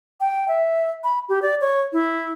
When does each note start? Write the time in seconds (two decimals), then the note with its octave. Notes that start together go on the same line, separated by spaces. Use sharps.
0.21 G5
0.48 E5
1.04 B5
1.29 G4
1.42 D5
1.61 C#5
1.93 E4